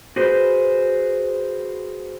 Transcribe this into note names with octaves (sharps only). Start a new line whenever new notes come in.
F#4 G#4 B4 C5